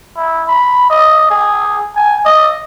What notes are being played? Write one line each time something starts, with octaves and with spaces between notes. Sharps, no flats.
E4
B5
D#5
G#4
G#5
D#5